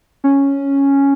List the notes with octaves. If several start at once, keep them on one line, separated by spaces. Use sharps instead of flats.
C#4